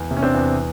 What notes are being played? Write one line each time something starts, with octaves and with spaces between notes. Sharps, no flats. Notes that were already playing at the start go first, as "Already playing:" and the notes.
Already playing: E2
C3
C#4
C4 D4
E2